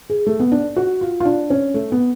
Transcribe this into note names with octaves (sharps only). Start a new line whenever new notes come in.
G#4
A3
B3
D4
F#4
F4
F4
D4
C#4
A3
B3